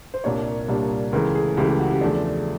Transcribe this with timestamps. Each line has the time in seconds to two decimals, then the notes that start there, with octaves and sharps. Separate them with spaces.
0.14 C5
0.24 C2 A#2 G3 A#3 D4 C#5
0.68 C2 A#2 G3 A#3 D4
1.13 C#2 C#3 E3 A3 A#4
1.35 G#4
1.57 C#2 C#3 E3 A3 G4
1.68 G4
1.79 F#4
1.91 G4
2.01 E2 C#3 F3 A3 D4